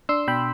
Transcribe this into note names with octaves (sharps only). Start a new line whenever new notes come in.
D4 C6 E6
B2 G5 B5